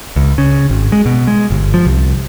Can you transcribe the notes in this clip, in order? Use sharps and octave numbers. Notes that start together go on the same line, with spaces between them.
C#2
C#3
G#1
G#3
B2
G#3
G1
F3
C2